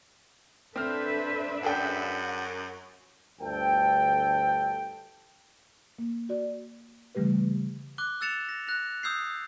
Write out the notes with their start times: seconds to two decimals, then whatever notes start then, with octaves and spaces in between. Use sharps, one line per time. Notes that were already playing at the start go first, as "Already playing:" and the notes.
0.76 C4 D4 A4 B4 C5 E5 F6
1.63 F#2 G#4 A4 F#5 G5
3.40 G1 D2 A4 G5
5.98 A#3
6.29 F#4 D5
7.15 C#3 E3 G3 A3 G4 B4
7.98 D6 F#6 G7
8.21 E6 F#6 A6 C#7 E7 F7
8.49 A#6
8.67 F#6 A#6 F7
9.03 D#6 E6 G6 C7